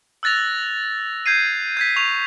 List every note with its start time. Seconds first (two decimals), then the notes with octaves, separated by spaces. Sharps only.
0.23 E6 F#6 A6 A#6 F7
1.26 G6 G#6 C7 D#7
1.77 G6 G#6 B6
1.96 C#6 F7